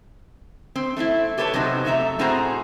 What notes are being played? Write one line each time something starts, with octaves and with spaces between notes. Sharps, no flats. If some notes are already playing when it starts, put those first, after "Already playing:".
C4
A3 C4 D#4 E4
G4 A4 B4 C#5 A5
C3 F#3 B3 D#4 C5
F2 A3 E5 A#5
A2 C4 F#4 G#4 C5 A#5